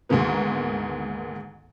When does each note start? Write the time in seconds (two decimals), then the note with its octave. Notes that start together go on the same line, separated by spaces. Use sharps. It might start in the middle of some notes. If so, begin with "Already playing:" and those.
0.09 D2 G#2 B2 D#3 A#3 B3